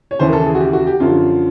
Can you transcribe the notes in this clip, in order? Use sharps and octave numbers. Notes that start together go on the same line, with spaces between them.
C#5
D#2 C#3 E3 C5
A#4
A4
G#4
F#4
G4
F#4
G4
F#2 D3 F3 F4